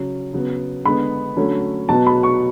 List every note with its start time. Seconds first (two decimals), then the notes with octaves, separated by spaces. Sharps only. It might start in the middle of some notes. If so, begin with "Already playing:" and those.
Already playing: C#3 F#3 C#4
0.33 C#3 F#3 B3
0.85 D3 G#3 B3 B5
1.36 D3 F#3 A3 C#4
1.89 B2 F#3 B3 A5
2.07 B5
2.23 C#6